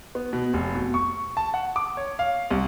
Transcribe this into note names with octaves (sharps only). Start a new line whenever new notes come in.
B3
B2
F1
B2
C#6
A5
F#5
D6
C#5
F5
C2